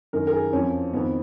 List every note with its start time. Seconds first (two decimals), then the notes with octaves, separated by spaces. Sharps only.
0.13 F#2 D#3 A#4
0.27 A#4
0.33 G#4
0.53 F2 F3 C#4
0.93 F2 D#3 B3